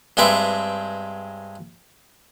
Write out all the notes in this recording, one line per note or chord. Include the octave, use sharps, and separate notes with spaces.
G2 G#3 C4 D4 B4 E5